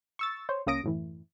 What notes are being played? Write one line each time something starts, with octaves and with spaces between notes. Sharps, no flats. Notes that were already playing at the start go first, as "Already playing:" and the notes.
C#6 E6 A6
C5 C#5
C#2 A#3 C#4 D#6 A#6 D7
F#2 A2 E3